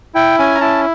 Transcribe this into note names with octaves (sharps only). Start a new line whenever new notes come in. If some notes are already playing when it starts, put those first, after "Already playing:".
E4 G5
C#4 G#5
A#5
E4 A5